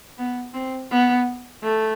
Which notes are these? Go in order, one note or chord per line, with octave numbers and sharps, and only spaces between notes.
B3
C4
B3
A3